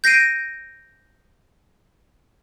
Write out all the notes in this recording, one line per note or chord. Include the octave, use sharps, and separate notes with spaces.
G6 A#6 C7 D7 D#7